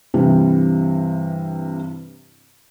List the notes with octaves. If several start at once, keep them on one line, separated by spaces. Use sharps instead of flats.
G2 C3 E3 G3